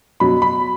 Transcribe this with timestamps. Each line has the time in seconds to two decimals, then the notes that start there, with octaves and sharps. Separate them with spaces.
0.20 B2 F#3 B5
0.42 B5